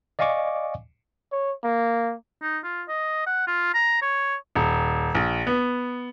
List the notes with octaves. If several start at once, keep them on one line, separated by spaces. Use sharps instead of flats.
D5 D#5 F5 G#5 C#6 D6
C#5
A#3
D#4
F4
D#5
F#5
F4
A#5
C#5
D#1
A#1
B3